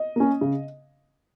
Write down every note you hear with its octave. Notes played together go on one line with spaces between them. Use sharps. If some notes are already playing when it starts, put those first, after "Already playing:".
Already playing: D#5
A#3 C#4
C#3